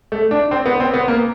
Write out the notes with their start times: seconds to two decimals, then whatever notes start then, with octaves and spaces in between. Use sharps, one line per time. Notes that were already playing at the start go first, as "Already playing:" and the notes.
0.12 A3
0.31 D4
0.51 C4
0.66 B3
0.80 C4
0.94 B3
1.08 A#3